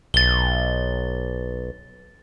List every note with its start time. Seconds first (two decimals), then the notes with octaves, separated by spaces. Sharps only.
0.14 B1 A6 G7